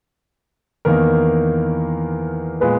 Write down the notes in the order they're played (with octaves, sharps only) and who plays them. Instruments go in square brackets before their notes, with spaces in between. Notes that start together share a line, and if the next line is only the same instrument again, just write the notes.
[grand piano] E2 D#3 A#3 A#4
A#2 G#3 B3 B4